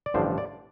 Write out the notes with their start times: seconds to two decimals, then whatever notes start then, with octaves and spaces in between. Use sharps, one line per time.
0.06 D5
0.14 A1 G2 D3 F3 C5
0.38 D5